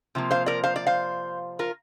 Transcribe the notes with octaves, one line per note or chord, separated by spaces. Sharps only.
C3 F3 A#3
C5 F5
A#4 D5
C5 F5
D5
C5 F5
F4 A#4